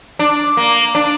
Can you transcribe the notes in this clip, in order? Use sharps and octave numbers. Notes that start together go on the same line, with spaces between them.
D4
A#3
D4